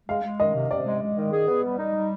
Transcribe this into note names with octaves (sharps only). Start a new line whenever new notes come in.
G#3 F5
G#3
D#3 D#5
C3
C3 D5
G#3
G#3
D#3
G#4
B3
G3
D#4
G3